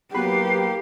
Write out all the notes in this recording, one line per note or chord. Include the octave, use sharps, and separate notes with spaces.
F#3 A#3 B3 G4 B4 C7